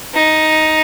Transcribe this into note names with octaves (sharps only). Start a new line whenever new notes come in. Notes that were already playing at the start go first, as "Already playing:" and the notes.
D#4